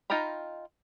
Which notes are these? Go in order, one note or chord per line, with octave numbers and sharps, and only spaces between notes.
D#4 F4 G5 A#5 B5